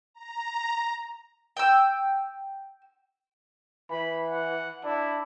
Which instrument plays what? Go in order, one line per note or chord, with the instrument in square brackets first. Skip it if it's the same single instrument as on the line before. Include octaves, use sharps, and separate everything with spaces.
[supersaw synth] A#5
[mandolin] G5 E6
[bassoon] E3 [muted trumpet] B5
[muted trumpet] F#5
[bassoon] D4 [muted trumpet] E4